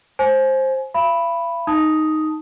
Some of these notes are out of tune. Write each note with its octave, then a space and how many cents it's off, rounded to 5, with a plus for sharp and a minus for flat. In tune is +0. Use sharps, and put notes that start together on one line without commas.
C5 +15 G#5 +25
F5 -45 B5 +0
D#4 +0 A5 +0 D#6 +5